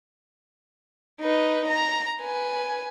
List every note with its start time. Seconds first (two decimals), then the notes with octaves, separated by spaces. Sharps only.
1.22 D#4 B4
1.68 A#5
2.21 B4 G#5